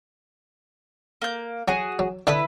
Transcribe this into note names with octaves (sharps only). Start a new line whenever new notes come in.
A#3 G6
F#3 F#4 G#4
F#3
D3 E4 B4 D#6